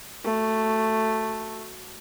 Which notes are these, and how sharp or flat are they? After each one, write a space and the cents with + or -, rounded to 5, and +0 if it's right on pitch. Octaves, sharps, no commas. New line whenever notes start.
A3 +5 F#4 +0